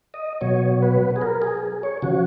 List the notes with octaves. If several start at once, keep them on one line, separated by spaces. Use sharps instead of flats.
D#5
B2 F#3 C#5
B4
G#4
A#4
G#4
C#5
C#3 F3 F#4